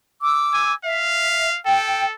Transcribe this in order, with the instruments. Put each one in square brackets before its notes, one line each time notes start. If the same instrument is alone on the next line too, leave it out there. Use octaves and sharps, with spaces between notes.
[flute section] D6 E6
[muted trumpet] G#5
[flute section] E5 [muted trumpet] F5
[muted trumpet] A4 [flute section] G5